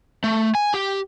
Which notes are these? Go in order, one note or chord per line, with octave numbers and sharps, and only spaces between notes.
A3
G#5
G4